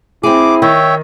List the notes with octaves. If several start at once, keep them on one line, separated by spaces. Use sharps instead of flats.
C4 E4 G#4 D6
D#3 C#5 E5 G5